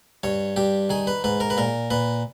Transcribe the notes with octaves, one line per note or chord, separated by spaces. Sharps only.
G2 C#5
G2 G4
D#3 G#4
B4
G#2 B4
A#4
B4
A#2 A#4
A#2 B4